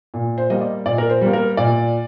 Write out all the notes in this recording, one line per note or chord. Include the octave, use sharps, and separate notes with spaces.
A#2
C5
G3 A#3 D#5
D5
A#2 D5
A#4
C5
G3 A#3
A#4
A#2 D5